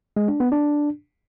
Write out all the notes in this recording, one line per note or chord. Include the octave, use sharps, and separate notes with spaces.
G#3
D4
B3
D4